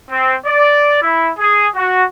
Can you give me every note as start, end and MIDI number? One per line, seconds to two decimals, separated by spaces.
0.11 0.35 60
0.46 1.00 74
1.02 1.30 64
1.38 1.68 68
1.76 2.04 66